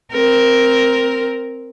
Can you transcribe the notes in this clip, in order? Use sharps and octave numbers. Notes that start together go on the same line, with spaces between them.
C4 A#4